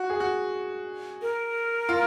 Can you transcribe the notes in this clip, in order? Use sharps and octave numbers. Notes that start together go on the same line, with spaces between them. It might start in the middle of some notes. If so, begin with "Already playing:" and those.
Already playing: F#4
G#4
F#4
A#4
F4